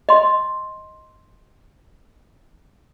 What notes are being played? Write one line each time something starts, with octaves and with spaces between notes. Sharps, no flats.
D#5 C6